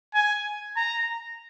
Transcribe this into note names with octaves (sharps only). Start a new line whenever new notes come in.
G#5
A#5